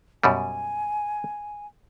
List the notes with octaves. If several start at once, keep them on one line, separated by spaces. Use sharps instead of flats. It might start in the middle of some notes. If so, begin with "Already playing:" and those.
F#2 B2 G3 G#5